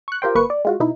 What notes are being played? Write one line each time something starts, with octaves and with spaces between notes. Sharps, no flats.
C#6 F#6
F4 G4 A#4 C5 G5
G1 A#3 B4 C#6 C#7
D5
G#3 F4 F#4
B2 D#4 E4